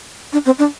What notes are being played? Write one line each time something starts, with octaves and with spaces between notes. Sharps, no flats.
D4
C4
D4